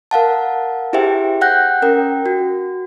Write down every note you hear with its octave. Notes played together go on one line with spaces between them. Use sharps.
A#4 F5 F#5 A5
E4 G4 G#4 C5 E5 G5
F#5 G5 F#6 G6 A#6
C#4 A#4 G5
F#4